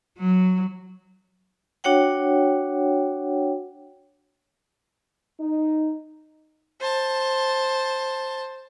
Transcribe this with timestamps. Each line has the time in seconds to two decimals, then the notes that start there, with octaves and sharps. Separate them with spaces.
0.18 F#3
1.84 D4 F#4 C#5 F#5 G5
5.40 D#4
6.81 C5 A5